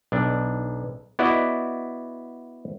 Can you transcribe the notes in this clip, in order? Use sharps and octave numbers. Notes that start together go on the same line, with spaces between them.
B1 D4
B3 E4 F#4 D5 D#5